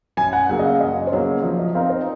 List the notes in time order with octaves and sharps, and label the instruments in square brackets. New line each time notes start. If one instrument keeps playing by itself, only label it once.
[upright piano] F#2 [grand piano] G#5
[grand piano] F#5
[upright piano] C#3 F#3 A#3 [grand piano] F#5
[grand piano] D#5
F5
[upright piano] F#2 [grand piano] D#5
[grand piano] C5
[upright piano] C#3 F#3 A#3 [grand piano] C#5
[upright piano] F3 [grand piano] D#5
[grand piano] D#5
[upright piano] C4 D#4 A#4 [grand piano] F5
[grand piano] C5